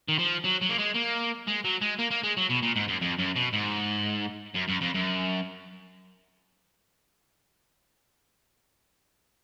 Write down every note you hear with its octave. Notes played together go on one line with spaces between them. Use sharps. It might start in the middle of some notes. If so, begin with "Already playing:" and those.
D#3
F3
F#3
F#3
A#3
G#3
A#3
G#3
F#3
G#3
A#3
A#3
G#3
F#3
B2
A#2
G#2
F#2
F2
F#2
B2
G#2
F#2
F#2
F2
F#2